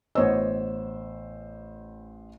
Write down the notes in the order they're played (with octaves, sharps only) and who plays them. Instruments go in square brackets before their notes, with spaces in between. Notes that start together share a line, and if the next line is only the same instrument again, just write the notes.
[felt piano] A1 C5 E6 [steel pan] B3 C#5 D#5